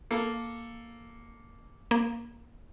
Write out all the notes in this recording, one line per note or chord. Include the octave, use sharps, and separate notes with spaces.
A#3 A4
A#3